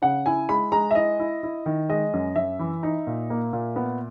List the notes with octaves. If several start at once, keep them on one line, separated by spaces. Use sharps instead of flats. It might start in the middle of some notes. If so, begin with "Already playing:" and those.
C#3 F#5
E4 G#5
G#3 B5
G#3 A#5
E5
E4 D#5
E4
E4
D#3
G#3 D#5
F#2
F#2 E5
E3
D#4
A#2
A#3
A#2
B3